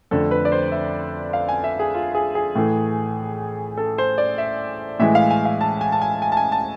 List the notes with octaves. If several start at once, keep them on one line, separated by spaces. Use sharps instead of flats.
F2 D3 A3 A4
B4
D5
C5
E5
F5
G#5
E5
G#4
F4
G#4
G#4
A2 E3 A3
A4
C5
D5
E5
A2 E3 G#3 E5
F5
G#5
F5
A5
G#5
A5
G#5
G#5
A5
G#5
A5